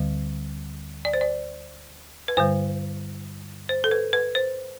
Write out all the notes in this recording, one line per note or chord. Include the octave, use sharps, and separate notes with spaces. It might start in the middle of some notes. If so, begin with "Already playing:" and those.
Already playing: D2 D3 G3
D5
C5
D5
B4
G2 D3 G3 C5
C5
A4
B4
B4
C5